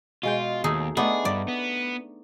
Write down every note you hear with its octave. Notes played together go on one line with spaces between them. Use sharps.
B2 G#3 F4 G5
D#2 A3 D#4 G#4
A3 B3 D4 D#4 G#4
G2 D5
B3